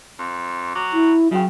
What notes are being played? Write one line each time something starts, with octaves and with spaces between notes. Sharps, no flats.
F2
F#3 D6
E4
C#3 F#3 F#4 G5